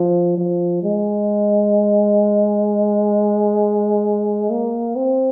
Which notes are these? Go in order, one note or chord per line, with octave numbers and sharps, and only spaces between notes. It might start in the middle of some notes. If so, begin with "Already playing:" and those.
Already playing: F3
F3
G#3
A#3
C4